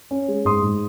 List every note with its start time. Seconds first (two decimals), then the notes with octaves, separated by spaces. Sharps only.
0.11 C#4
0.28 G#3
0.45 G#2 C6 D#6
0.63 G#2